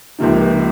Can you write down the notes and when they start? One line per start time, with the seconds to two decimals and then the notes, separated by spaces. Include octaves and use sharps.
0.19 C#2 C3 F3 A#3 D#4